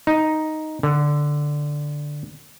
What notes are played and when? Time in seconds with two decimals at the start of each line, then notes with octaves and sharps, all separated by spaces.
0.07 D#4
0.83 D3